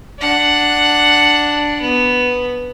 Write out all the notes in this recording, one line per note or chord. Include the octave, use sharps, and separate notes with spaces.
D4 F#5
B3